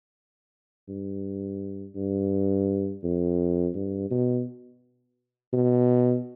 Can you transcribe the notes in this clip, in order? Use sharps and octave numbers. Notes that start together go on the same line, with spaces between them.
G2
G2
F2
G2
B2
B2